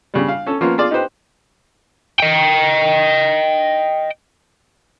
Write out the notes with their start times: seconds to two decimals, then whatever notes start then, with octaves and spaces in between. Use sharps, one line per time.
0.14 C#3 G3
0.28 F5
0.46 C#4 A4
0.61 F3 A#3 B3 C#4 F4
0.78 F4 G#4 D5
0.91 D#4 G4 B4 C5 G5
2.20 D#5 G5